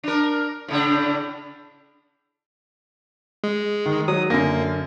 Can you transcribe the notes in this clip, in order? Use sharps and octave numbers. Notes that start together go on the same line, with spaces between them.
D4 A#4
A2 C#3 D4
G#3
D#3
F#3 D#6
F#2 D3 A#3 A#6